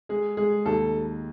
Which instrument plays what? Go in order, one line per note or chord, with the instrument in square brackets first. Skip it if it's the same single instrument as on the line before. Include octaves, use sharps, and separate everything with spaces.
[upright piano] G#3 [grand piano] G#4
[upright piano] G#3 [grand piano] G#4
[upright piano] D#2 [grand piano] A4